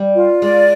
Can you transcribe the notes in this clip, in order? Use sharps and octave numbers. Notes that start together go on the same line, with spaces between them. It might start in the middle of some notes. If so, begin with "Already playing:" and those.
Already playing: G3
F4
G#3 D5